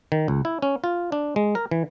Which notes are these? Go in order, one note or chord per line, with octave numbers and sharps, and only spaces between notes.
D#3
C#2
E4
C#4
F4
D4
G#3
A#4
E3